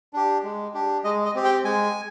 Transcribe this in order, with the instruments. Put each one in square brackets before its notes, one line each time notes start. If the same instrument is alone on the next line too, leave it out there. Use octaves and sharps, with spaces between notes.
[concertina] D4 G4
G#3
D4 G4
G#3 D#5
D#5
C4 G4
G5
G#3 G#5